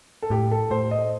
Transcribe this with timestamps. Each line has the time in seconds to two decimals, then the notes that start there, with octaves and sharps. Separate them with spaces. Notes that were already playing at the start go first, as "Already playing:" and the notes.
0.22 A4
0.30 A2 G4
0.51 A4
0.71 A2 C5
0.91 D#5